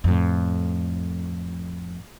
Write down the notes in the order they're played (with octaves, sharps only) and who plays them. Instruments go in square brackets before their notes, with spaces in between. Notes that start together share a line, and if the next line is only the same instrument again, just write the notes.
[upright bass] F2 A2